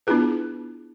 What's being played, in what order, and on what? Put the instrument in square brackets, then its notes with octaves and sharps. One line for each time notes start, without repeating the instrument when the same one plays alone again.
[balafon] B3 D4 E4 F4 G#4 B4